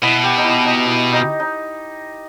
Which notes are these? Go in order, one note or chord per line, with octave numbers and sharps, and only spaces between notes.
B2 E4
G4
D#4
E4
D#4
E4
D#4
D#4